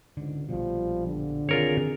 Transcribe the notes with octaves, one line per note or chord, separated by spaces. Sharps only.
C#2 G#2 D3
A#1 B2 F3 G3
D3
D#3 C4 F4 G#4 A#4 C#5